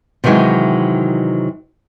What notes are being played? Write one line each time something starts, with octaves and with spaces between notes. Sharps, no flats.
C3 D#3 E3 F#3 G#3